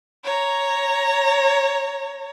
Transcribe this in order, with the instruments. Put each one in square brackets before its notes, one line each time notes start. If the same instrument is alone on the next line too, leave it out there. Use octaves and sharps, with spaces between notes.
[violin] C#5 A#5